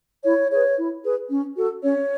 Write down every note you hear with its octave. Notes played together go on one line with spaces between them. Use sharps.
E4 C#5
G#4 B4 C#5
E4
G#4 B4
C#4
F#4 A4
C#4 C#5